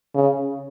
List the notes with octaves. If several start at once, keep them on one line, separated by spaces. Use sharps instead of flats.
C#3